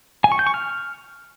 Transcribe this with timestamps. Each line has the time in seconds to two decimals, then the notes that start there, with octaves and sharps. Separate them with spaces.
0.24 G#5
0.32 C#6
0.39 G6
0.47 C#6
0.54 F6